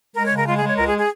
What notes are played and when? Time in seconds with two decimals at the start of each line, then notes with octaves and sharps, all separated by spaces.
0.16 G#3 A#4
0.26 C#3 C#5
0.37 A#4
0.47 G#3 F4
0.58 G#4
0.63 G#3 C#5
0.78 C#2 A#4
0.89 G#4
0.99 G#4